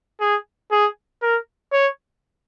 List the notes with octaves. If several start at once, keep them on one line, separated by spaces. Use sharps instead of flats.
G#4
G#4
A#4
C#5